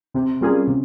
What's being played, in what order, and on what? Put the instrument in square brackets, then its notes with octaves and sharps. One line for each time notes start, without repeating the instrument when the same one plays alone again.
[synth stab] C3 [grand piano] C4
[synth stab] G3 A#3 F4 G#4 [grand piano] C#4
[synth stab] C3 [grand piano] C4